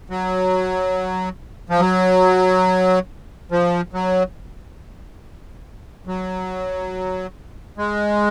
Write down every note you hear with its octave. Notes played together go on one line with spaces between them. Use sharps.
F#3
F3
F#3
F3
F#3
F#3
G#3